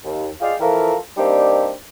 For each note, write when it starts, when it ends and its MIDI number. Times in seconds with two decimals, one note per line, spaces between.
0.05 0.28 39
0.42 0.54 65
0.42 0.54 68
0.42 0.54 74
0.42 0.54 75
0.42 0.54 77
0.42 0.54 79
0.61 0.95 52
0.61 0.95 53
0.61 0.95 65
0.61 0.95 69
0.61 0.95 70
1.17 1.69 55
1.17 1.69 58
1.17 1.69 60
1.17 1.69 62
1.17 1.69 63
1.17 1.69 67